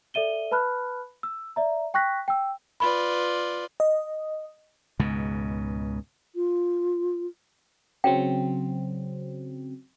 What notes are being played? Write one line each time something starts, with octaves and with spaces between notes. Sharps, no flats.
A4 D5 E5 D#7 G7
B4 A5 B5 F6 F#6
E6
D5 E5 A#5
G5 C#6 F#6 A#6 B6
G5 E6
F4 B4 D5 B5
D#5
C#2 G#2 B2
F4
C#3 F#3 C4 G5